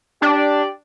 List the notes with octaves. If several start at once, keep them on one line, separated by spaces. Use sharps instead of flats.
D4 G4 D5